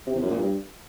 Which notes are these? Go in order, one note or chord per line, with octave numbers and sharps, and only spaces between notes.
C3
E2
F#2
A#2
G2